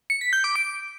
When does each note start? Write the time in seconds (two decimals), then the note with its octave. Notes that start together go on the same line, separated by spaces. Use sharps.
0.10 C#7
0.21 B6
0.33 G6
0.44 D6
0.56 D7